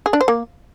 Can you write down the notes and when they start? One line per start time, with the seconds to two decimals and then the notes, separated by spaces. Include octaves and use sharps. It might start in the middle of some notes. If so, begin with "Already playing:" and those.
0.06 G#4
0.13 D4
0.21 C5
0.28 A#3